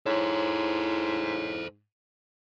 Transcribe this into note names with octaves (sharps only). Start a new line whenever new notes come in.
G#2 E4 A4 C5 C#5